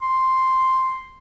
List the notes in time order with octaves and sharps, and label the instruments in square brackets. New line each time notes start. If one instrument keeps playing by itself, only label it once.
[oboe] C6